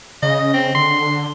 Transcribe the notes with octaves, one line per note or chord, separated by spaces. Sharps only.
C#3 D#5
C4
D3 C6